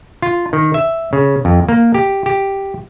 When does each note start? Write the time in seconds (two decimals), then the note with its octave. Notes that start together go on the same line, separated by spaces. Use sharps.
0.22 F4
0.53 D#3
0.74 E5
1.13 C#3
1.45 F2
1.69 A#3
1.94 G4
2.26 G4